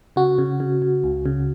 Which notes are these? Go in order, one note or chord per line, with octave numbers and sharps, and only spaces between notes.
C#3 F#4
C#3
C#3
C#3
C#2
C#3